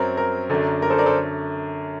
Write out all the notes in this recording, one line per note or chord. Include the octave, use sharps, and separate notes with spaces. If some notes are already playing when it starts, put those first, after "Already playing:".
Already playing: F#2 F#3 C4 A#4
A#4
F#2 D3 A3 D4
A#4
A4 C5
A#4 D5
A4 C5